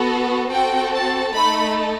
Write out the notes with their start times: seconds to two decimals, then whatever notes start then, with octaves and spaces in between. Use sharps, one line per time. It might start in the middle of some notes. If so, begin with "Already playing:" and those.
Already playing: B3 F#4 A4
0.51 C4 F#4 A4 G5
0.93 A5
1.34 A3 D#4 A4 B5